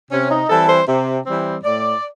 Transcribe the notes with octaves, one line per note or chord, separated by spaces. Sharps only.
C3 C#4
D#4
E3 G3 C4 A4
C5
C3
E3 G3 C4
A2 D5